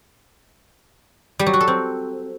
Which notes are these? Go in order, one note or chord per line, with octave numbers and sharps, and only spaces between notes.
G3
F#3
F#4
A4
C4